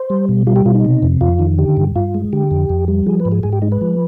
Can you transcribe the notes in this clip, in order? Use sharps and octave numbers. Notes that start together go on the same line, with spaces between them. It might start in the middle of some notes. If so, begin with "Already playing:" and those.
Already playing: C5
G3
B2
G3 F4
G4
B2 F4
D#4
C3
F2
F2 F4
D#3
D3 G4
G2
G2 F4
G#3
D3 G4
F2
F2
G3
F3 G#4
B4
G#2
G#4
G#2 G#4
G4
G#3 D#4
B4
F3